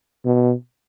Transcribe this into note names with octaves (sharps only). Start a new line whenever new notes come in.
B2